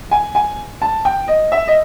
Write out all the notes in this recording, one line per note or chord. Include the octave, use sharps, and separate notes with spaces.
G#5
G#5
A5
G5
D#5
E5
D#5